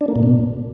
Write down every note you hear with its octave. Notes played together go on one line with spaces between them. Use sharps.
D4
A#3
A#2
B2